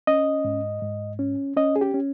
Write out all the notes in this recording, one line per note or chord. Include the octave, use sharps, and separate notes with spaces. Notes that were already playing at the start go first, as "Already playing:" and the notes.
C#4 D#5
G#2
G#2
C#4
C#4 D#5
G#4
G4
C#4